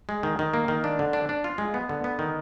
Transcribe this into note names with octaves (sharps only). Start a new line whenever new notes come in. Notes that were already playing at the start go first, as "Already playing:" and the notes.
G#3
D#3
D#3
A#3
D#3
D4
D3
D4
D4
F4
G#3
B3
D3
B3
D#3